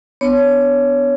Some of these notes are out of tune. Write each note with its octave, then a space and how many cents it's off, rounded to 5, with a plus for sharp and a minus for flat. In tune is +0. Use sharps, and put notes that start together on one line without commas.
B3 +20 D4 +0 C#5 +10